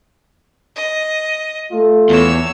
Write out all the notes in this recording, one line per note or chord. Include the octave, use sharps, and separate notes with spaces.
D#5
A3 F4
E2 C#5 E6